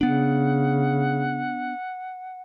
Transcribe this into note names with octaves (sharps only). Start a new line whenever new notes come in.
C#3 B3 D4 F#5